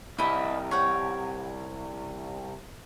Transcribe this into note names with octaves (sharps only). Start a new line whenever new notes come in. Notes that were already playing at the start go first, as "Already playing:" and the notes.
C2 E4 D#5 B5
C#5 F#5 G5